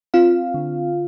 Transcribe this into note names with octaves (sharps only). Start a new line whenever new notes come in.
C4 F4 F5
D3